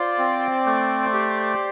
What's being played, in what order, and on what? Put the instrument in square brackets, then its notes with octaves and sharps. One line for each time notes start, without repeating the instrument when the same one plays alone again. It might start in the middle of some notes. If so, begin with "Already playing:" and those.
Already playing: [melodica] F4 [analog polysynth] C5 D5
[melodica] C4
A3
G4